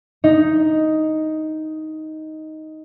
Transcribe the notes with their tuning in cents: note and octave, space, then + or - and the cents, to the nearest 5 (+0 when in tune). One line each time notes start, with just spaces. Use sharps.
D#4 +5